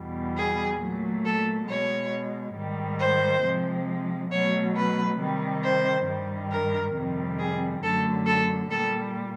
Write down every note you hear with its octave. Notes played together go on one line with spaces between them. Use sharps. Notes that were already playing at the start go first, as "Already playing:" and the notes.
Already playing: E2 B2 G3
G#4
A#2 F#3 A3
A4
B2 G#3 C#5
G#2 D#3 G3
C5
C3 F3 G#3
B2 F#3 A3 C#5
B4
C3 D#3 G3
C5
G2 D#3 G3
A#4
F2 C3 D#3 G3
G#4
F#2 D3 F#3 A3 A4
A4
A#2 G3 A4